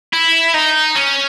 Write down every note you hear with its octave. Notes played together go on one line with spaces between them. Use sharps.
E4
D#4
C#4